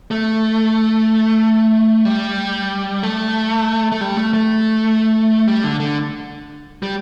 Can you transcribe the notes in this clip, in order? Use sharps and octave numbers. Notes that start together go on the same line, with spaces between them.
A3
G3
A3
A3
G3
A3
A3
G3
D3
D3
G3